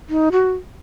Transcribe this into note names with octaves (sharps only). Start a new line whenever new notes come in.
D#4
F#4